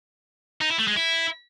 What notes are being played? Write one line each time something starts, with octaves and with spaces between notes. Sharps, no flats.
D#4
E4
A3
G#3
E4